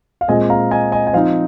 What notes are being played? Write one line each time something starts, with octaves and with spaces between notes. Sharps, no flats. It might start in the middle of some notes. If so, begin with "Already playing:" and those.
F5
A#2 G#3 C4 D#5 G#5
F5 A#5
D#5 G#5
D#5 G#5
G#5
F3 C4 D#4 C5 F5